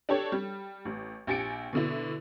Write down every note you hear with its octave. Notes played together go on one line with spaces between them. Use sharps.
D4 G4 A4 C#5
G3
A1
A#1 G4 G#5 A6 C#7 D7
B2 D3 E4